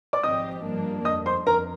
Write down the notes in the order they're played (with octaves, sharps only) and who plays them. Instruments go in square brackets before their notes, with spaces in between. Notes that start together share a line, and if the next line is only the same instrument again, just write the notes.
[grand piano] D5 D6
[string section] G#1 G#2 F3 C4 G4 [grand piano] D#5 D#6
[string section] G2 F3 A#3 D4
[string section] G1 F2 D3 [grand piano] D#5 D#6
[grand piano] C5 C6
[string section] F2 [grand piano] A#4 A#5